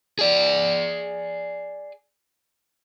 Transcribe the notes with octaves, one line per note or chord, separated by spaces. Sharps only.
G#4 D5